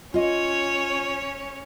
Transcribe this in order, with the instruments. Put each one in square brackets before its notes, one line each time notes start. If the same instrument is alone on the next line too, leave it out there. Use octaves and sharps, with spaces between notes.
[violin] C#4 C#5 [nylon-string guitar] F4 D#5